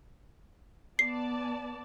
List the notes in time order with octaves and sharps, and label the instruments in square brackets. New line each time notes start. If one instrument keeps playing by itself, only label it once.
[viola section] B3 D5 A5 [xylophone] C7